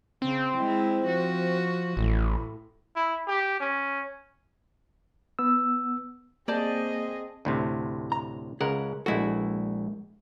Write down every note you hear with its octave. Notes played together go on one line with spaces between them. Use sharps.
C#3 C4
G#3 E4
F3 F#4
A1 A2
E4
G4
C#4
B3 E6
A#3 C4 G#4 D5 D#5 A5 G6
D2 A2 C3
A#5
C#2 G#4 A#4 F#5
A#1 G#3 E4 F#4 A4